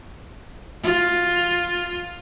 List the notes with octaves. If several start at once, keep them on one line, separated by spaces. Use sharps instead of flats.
F4